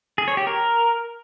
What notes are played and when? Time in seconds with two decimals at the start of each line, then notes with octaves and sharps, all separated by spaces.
0.18 G#4
0.28 C#5
0.37 G4
0.47 A#4